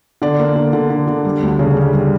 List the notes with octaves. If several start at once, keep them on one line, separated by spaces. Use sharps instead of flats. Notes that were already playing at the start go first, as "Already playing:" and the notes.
D3 D5
A#3
D3
D3
D3
D3
G3
D2
C#3
G3
G3